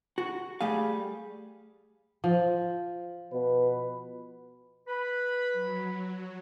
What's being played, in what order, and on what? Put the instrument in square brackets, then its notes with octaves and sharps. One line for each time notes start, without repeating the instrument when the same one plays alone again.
[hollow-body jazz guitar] F#4
G3 A3 G#4 F5
[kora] F3
[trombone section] B2 B4
[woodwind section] B4 B5
[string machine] F#3